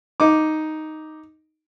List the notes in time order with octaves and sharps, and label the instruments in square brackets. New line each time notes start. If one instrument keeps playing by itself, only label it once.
[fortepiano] D#4 D6